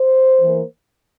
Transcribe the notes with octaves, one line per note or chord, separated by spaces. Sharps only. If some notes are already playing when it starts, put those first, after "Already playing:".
Already playing: C5
E3 A#3